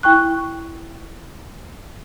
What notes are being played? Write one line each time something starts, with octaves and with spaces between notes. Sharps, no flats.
E4 G5 C#6 F#6